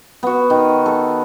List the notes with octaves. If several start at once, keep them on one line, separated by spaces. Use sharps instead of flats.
B3 F#4
D#3
A4